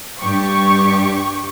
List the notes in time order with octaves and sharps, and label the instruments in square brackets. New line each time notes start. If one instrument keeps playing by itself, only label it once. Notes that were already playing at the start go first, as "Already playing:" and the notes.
[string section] G2 G4 C#6